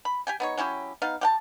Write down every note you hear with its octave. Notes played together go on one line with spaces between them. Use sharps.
B5
G4 G5 G#5
B3 D#4 C#5
F#3 C#4 E4 G4
B3 D#4 F5
G4 F#5 A5